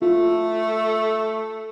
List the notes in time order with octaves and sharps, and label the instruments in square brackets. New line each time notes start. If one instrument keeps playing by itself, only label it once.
[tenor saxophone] A3 [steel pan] F4